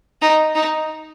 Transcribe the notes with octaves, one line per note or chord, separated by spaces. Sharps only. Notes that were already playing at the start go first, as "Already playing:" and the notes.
D#4
D#4